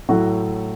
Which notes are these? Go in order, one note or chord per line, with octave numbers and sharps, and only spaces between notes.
A2 F#3 A3 F#4